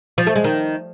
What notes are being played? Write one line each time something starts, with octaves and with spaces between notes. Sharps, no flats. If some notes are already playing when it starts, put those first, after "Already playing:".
F3
A3
G#3
D#3